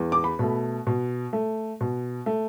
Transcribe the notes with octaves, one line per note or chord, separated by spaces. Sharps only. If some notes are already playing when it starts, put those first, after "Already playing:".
Already playing: E2
D6
B5
B2 A3
B2
A3
B2
A3